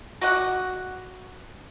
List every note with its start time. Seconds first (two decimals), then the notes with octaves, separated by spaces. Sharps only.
0.21 F#4 D5 D#5 F#5